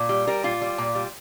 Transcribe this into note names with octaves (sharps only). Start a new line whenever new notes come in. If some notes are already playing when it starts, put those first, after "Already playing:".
Already playing: A#2
G3
G3 A#4
A#2 F4
G3
A#2
G3